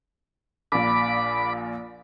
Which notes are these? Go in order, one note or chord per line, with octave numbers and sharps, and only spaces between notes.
A#1 A#2 B5 D6